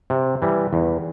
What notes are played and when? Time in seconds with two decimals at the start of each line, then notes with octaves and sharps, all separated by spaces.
0.10 C3
0.42 E3 G3
0.73 E2